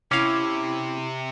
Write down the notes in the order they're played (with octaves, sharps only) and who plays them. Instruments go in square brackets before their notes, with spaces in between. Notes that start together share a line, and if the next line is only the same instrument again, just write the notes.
[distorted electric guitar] C3 [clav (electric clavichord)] C#4 F5 [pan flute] E4 [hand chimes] D6